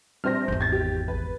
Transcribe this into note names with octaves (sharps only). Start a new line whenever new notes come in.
A#1 G3 C4 C5 F6 A#6
G#1 E2 G6
G#6 A6
G4
A#1 B4